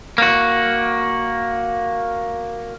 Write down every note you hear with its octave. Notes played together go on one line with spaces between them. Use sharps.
A#3 F#4